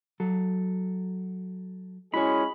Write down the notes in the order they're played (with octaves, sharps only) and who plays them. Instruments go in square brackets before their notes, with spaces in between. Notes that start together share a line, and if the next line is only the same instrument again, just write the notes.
[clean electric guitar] F#3 A4
[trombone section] G#3 C#4 G#4 [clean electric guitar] E4 F#4 C#5 [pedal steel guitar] B5